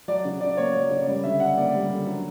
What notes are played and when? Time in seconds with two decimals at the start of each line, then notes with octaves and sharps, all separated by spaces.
0.08 F#3 D5
0.25 C#3
0.41 C#3 D5
0.57 A#3 C#5
0.74 F#3 D5
0.91 C#3 D5
1.07 G3 D5
1.24 D3 E5
1.40 D4 F#5
1.57 A#3 D5
1.74 G3
1.90 D3
2.07 F#3